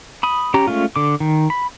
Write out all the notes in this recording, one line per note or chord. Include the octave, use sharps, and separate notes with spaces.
B5 D#6
C#4 G4 A#5
G#3 A3 C#4 F4
D3 D6
D#3
B5